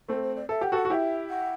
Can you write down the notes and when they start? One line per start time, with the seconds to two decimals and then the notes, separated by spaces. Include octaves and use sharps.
0.08 A3 C4 A4
0.23 C5
0.36 D5
0.49 A4 E5
0.61 G4 F#5
0.72 F#4 A4 F#5
0.85 F#4
0.90 E4 G4 E5 F#5
1.30 F#5